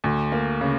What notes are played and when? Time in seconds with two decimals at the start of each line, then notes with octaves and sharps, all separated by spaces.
0.04 D2
0.32 A#3
0.61 C#3